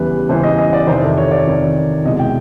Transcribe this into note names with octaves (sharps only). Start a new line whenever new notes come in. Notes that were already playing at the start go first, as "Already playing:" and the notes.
Already playing: E2 C#3 E3 G3 B4
E2 C#3 E3 G3 C5
D#5
D#5
D5
F2 C3 D#3 C5
A4
C#5
D5
F2 C3 D#3
C2 B2 G#3 D#5
G5